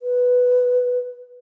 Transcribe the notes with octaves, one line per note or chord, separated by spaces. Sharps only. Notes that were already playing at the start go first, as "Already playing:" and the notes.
B4